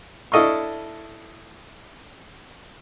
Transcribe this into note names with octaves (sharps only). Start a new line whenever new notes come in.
D4 E4 A4 D#5 F5 C#6